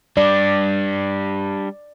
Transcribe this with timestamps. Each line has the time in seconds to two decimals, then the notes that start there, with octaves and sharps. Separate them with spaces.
0.17 G3 D4 D5